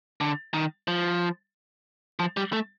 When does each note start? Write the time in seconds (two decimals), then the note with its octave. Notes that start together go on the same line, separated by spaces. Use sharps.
0.21 D3
0.54 D#3
0.88 F3
2.19 F3
2.37 G3
2.53 A3